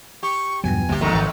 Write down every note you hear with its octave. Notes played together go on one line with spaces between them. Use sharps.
G4 C#6
E2 G2 B2 F3 F#3 B3 G#5
G1 D2 C3 A#3 G4
E2 D#3 A3 G4 G#4 E5 A#5
G#1 B4 C#5